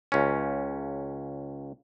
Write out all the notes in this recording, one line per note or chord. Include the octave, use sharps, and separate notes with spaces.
C#2 C#4